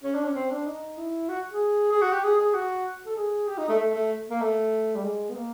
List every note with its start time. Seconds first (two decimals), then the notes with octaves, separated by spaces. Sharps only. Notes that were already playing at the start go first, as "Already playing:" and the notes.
0.04 C#4
0.14 D4
0.25 C#4
0.35 C4
0.51 D4
0.67 D#4
0.97 E4
1.29 F#4
1.50 G#4
1.92 G#4
2.02 F#4
2.13 G4
2.23 G#4
2.38 G#4
2.54 F#4
3.06 A4
3.16 G#4
3.47 G4
3.58 D#4
3.69 A3
3.79 A3
3.94 A3
4.30 A#3
4.41 A3
4.96 G3
5.04 G#3
5.29 B3
5.35 A#3